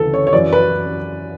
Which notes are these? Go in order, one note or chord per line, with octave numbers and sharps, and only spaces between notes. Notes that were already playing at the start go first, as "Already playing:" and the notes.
Already playing: D2 C#3 E3 A4
C#5
C#5
F#2 E3 D5
B4